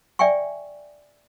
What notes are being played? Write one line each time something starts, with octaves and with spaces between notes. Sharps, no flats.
D5 E5 G5 G#5 C#6